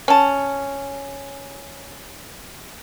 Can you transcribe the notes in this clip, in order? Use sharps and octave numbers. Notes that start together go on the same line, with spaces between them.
C#4 A5